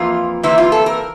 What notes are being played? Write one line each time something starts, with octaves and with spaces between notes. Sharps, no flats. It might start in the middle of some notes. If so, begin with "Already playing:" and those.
Already playing: F2 E3 A#3 F4
C3 E3 A#3 E4
F4
A4
A#4